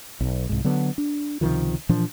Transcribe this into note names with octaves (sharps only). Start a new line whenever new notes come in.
B1
C2 G#2
D3 F#3 B3
D4
C#2 C3 D#3 F3
A#2 E3 F3 D4